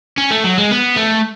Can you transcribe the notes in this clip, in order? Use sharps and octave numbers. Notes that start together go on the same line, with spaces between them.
C#4
A3
F#3
G#3
B3
A3